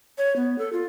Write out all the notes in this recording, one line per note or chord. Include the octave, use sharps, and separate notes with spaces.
C#5
B3
A4
F4